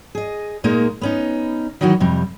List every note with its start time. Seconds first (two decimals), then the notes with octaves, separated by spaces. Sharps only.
0.15 G#4 D#5
0.64 A#2 G#3 A#3 D#4
1.01 B3 C#4 D#4
1.81 D#3 E3 F#3 D#4 E4 F#4
2.00 F2 C3 G3